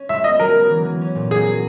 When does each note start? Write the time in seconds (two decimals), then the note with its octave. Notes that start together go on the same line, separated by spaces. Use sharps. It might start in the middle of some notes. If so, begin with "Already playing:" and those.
Already playing: C#4
0.09 G#3 E5
0.24 B3 D#5
0.40 F#3 A#4
0.55 F#3
0.70 E3
0.85 E3
1.01 C#4
1.15 A#2
1.31 F#3 G#4
1.46 F#3